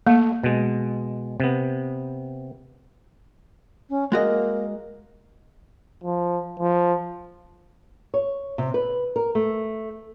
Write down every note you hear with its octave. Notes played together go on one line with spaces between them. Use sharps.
A3 A#3
B2 G#3
C3 B3
C#4
G#3 A#3 F#4 D#5
F3
F3
C#5
C3
B4
A#4
A3